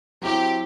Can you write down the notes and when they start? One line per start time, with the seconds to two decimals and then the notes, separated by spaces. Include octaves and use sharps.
0.21 F#3 C4 E4 G4